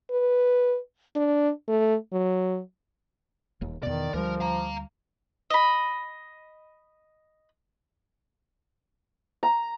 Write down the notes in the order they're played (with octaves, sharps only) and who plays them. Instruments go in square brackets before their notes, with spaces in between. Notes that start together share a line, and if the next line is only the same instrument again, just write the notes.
[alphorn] B4
D4
A3
F#3
[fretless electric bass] D#1 D#2
[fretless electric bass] E2 B2 [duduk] D#3 [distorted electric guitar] D5
[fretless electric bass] D2 G3 [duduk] F3 [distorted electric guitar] A#4
[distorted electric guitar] F5 A#5
[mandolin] D#5 B5
[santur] A#5